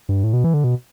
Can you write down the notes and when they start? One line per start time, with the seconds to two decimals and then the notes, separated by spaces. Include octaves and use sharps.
0.09 G2
0.24 A2
0.33 B2
0.44 E3
0.54 D3
0.64 B2